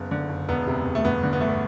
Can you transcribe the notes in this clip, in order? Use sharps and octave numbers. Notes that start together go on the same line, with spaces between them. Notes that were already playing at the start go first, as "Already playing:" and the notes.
Already playing: F#1 B3
D3
F#1
E1 B3
C3
E1
A3
G1 B3
D3
B3
G1 A3
B3